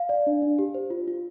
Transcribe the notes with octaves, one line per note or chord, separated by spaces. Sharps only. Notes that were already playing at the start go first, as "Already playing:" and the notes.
Already playing: F5
D5
D4
D4
G4
C5
F4
F4